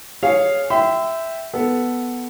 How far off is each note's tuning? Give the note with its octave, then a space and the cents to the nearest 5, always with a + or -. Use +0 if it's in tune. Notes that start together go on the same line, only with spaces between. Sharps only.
G#4 +0 C#5 +0 F5 +0
E5 +0 G5 +0 C6 -40
B3 +0 A4 +0